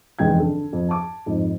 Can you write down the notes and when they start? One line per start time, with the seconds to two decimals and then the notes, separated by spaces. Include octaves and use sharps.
0.19 F1 E2 G#3 G5 G#6
0.39 D3 A4
0.73 F2
0.89 A5 D6
1.26 F2 G#2